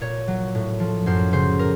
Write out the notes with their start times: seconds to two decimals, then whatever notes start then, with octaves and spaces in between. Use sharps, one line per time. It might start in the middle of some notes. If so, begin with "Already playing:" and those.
0.01 A#2 C#5
0.28 F#3
0.55 A2
0.80 F3
1.06 F#2 C5
1.33 C#3 C5
1.59 A#4